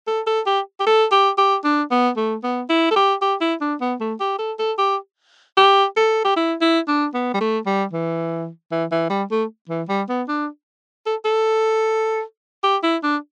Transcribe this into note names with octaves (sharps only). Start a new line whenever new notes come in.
A4
A4
G4
G4
A4
G4
G4
D4
B3
A3
B3
E4
A4
G4
G4
E4
D4
B3
A3
G4
A4
A4
G4
G4
A4
G4
E4
E4
D4
B3
G3
A3
G3
E3
E3
E3
G3
A3
E3
G3
B3
D4
A4
A4
G4
E4
D4